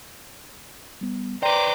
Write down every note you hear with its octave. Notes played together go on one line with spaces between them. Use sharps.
G3 B3
B4 C5 D5 G5 A#5 D6